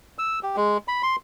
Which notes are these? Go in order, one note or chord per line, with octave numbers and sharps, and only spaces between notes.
E6
G4
G#3
B5
C6